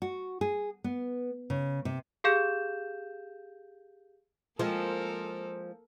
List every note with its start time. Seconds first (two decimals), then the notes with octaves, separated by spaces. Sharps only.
0.02 F#4
0.41 G#4
0.84 B3
1.50 C#3
1.85 C3
2.24 G4 G#4 F5 G6 E7
4.59 F3 G#3 A#3 C4 A4 A#4